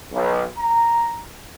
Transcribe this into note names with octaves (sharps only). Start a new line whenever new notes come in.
B1
A#5